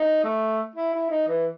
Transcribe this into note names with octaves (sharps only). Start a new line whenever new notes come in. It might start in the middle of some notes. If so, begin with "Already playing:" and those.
Already playing: D#4
A3
E4
E4
D#4
E3